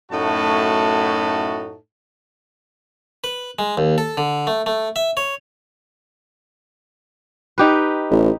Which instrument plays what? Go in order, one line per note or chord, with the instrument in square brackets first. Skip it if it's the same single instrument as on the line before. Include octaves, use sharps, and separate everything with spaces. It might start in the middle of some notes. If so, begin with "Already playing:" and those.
[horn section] F#2 A2 A3 D#4 F#4 A5
[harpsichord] B4
G#3
D#2
A4
D3
A3
A3
E5
C#5
[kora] D#4 G4 B4
[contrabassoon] A1